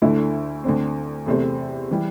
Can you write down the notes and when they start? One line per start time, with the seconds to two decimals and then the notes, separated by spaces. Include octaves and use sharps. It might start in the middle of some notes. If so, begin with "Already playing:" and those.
0.02 D2 D3 A3 E4
0.64 D2 D3 C4
1.26 E2 C3 A3 C4
1.91 E3 G3